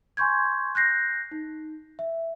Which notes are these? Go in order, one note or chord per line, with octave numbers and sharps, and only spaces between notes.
G#5 C6 C#6 G6 G#6
F#6 G6 A#6 C7
D#4
E5